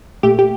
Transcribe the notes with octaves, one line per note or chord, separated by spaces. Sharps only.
A#2 A3 G4
G4